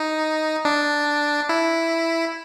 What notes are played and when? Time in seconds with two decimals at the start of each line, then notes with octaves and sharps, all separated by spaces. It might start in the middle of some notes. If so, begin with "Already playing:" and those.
Already playing: D#4
0.65 D4
1.49 E4